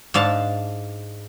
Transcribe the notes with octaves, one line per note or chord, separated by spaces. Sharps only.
G#2 D4 F5 A5